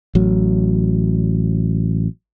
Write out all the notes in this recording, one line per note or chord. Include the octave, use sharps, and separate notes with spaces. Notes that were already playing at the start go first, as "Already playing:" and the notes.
A1 F#3